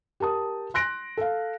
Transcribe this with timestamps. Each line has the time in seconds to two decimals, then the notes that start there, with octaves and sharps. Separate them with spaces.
0.20 G4 A#4 A5 D#6
0.74 C6 F#6 A#6 D7
1.17 A4 F5